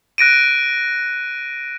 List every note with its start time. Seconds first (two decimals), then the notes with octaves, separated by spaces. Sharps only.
0.18 F#6 A#6 D7 D#7